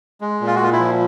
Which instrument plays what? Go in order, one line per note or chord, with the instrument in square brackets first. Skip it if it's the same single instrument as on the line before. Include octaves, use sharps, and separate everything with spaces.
[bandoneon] G#3
A#2
F4
F#4
A#2 F4
E4
F3